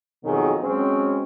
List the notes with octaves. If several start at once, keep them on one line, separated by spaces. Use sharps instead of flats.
F2 B2 D#3 F#3 G#4
F#3 G#3 C4 C#4